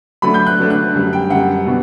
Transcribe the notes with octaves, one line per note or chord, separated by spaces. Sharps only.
D3 F#3 A3 D4 B5
G6
F#6
D3 F#3 A3 D4
F#6
F#2 D3 G3
G5
F#2 D3 G3 F#5
B2 F#3 B3 D4